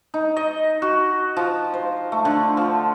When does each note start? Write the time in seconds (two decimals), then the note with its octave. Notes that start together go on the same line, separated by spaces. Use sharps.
0.14 D#4
0.36 D#5
0.82 F#4
1.37 F3
1.74 C5
2.12 A3
2.25 D3
2.57 F3